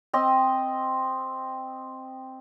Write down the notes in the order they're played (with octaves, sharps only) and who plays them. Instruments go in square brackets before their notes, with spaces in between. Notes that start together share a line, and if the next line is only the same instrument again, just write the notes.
[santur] C4 D#5 E6